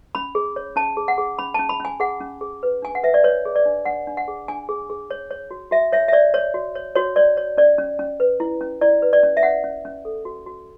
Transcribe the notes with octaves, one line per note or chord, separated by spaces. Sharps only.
C#4 B5
G#4
C#5
C#4 A5
G#4
F#5
G#4
C#4 B5
C#4 A5
B5
C#4 G#5
G#4 F#5
C#4
G#4
B4
D4 G#5
F#5
B4 E5
D5
B4 C#5
G#4
D5
D4
D4 F#5
D4
F#5
G#4
D4 G#5
G#4
G#4
C#5
C#5
F#4
F#4 E5
C#5 E5
E5
C#5 D5
C#5
F#4
C#5
F#4 C#5
C#5 D5
C#5
C#4 D5
C#4
C#4
B4
E4
C#4
E4 D5
B4
D5
C#4
E5
C#4 F#5
C#4
C#4
A4
F#4
F#4